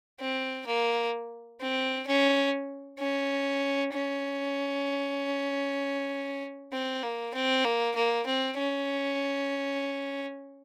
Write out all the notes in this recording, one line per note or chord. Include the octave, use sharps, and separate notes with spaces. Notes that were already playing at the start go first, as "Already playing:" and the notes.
C4
A#3
C4
C#4
C#4
C#4
C4
A#3
C4
A#3
A#3
C4
C#4